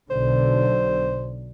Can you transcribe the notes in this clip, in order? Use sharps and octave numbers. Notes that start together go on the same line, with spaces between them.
B1 D3 C5